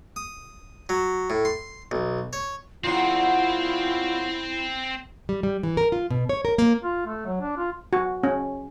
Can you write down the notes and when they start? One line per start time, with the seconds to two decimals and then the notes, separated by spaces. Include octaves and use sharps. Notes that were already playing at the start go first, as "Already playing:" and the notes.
0.16 D#6
0.89 F#3
1.30 A2
1.45 C6
1.91 B1
2.33 C#5
2.84 A#2 C#3 F#3 C4 E4 F4 C5
5.29 G3
5.43 G3
5.63 E3
5.77 A#4
5.92 F4
6.10 B2
6.29 C#5
6.45 A#4
6.58 A#3
6.83 F4
7.07 A3
7.26 F#3
7.41 D4
7.58 F4
7.93 F#4
8.23 C#4